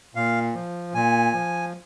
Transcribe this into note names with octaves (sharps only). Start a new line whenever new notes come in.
A#2 F5
F3
A#2 G#5
F3